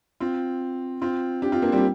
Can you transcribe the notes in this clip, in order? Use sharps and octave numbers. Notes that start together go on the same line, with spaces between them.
C4 F4
C4 F4
D4 G4
C4 F4
A#3 D4
G3 C4
G4